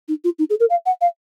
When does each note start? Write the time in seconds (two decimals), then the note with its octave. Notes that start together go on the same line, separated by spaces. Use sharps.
0.08 D#4
0.24 F4
0.38 D#4
0.50 G#4
0.60 A#4
0.69 F5
0.86 F#5
1.01 F5